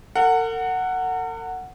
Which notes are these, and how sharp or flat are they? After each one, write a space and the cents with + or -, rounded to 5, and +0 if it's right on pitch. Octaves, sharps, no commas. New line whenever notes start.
A#4 -45 F#5 +0